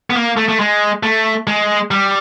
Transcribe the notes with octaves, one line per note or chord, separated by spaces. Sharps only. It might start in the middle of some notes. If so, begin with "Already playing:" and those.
B3
A#3
A3
A3
G#3
A3
G#3
G3